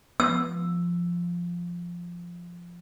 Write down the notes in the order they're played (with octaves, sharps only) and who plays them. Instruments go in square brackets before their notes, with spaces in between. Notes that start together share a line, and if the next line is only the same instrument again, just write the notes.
[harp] F3 [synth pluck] B3 [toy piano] E6